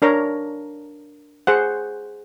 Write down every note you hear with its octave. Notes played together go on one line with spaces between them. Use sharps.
D4 A#4 C#5 A#5
G#4 C5 F#5